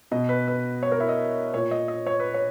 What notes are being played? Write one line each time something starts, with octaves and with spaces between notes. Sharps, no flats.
B2 D#5
B4
B4
C#5
A#4
E4
D#5
A#2 C#5
D#5
D#5
C#5
B4
C#5